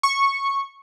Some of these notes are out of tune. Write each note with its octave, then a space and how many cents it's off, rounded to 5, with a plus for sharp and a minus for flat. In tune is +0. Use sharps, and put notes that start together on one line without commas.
C#6 -10